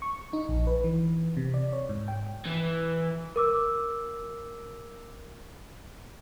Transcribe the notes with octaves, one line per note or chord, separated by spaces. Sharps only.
C#6
D#4
A#1
B4
E3
C3
D5
C#5
G#2
G5
E3
A#4 D6 E6